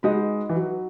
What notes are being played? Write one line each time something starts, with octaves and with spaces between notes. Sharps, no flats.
G#3 D#4 F#4 B4 D#5
E3
F#3